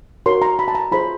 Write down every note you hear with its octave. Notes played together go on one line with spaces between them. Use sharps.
F#4 A#4 C#5 C6
A#5
B5
A5
A#5
F4 G#4 C5 B5